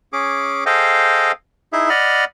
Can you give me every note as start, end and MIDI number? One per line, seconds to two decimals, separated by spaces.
0.13 0.64 61
0.13 0.64 68
0.13 0.64 86
0.66 1.32 68
0.66 1.32 69
0.66 1.32 72
0.66 1.32 75
0.66 1.32 77
0.66 1.32 79
1.73 1.89 63
1.73 1.89 64
1.73 1.89 68
1.73 1.89 76
1.89 2.25 74
1.89 2.25 75
1.89 2.25 78
1.89 2.25 83
1.89 2.25 89